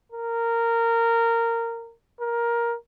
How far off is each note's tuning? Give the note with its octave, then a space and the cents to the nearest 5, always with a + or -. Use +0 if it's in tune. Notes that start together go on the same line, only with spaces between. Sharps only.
A#4 -15
A#4 +10